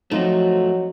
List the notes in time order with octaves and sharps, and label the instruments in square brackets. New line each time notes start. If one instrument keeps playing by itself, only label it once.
[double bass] F3 C4 [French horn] F#3 [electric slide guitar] A3 F4 F#4 [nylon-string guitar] D#4